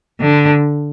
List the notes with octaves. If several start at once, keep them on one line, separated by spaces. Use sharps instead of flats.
D3